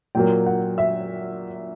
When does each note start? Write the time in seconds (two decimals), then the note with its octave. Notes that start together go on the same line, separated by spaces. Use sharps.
0.15 A#2 F#3 A#3 G5
0.46 F#5
0.78 E5